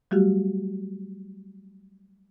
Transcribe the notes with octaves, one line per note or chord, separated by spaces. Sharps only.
F#3 G3 A3 F#4 G4